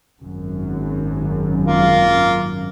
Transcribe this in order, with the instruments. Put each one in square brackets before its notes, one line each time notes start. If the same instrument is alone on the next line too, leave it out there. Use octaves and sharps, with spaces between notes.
[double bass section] G#1 F#2
[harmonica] A#3 F4